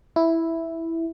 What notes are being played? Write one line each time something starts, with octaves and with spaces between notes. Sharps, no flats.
E4